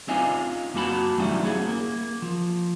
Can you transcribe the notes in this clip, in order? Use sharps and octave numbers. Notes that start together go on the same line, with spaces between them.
C4 C#4 D#4 F4 D#5 G#5
F#2 A#3 F#4 A5 B5
F#3 G3 A3 C#4 D#4 E4
F#3 C#4 G#4
A#3
F3